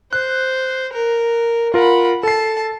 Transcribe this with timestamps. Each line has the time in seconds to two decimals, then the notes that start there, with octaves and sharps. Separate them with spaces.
0.13 C5 F#6
0.93 A#4
1.74 F4 A#4 F#5 B5
2.23 A4 A5 C7